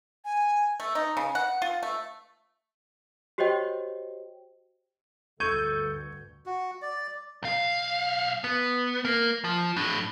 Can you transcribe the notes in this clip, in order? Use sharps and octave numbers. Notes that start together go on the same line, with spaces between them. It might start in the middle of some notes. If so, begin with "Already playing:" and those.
G#5
A3
D#4
C#3
F#5
F4
A3
F#4 G4 C5 C#5 D#5 G5
D2 G2 D3 A4 C#6 G6 G#6 D#7
F#4
D5
B1 F5
B3
A#3
F3
A2 D4